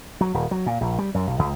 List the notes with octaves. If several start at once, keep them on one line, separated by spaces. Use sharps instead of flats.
F#3
D#1
F#3
A#2
A#1
G3
F#2
B1
C#2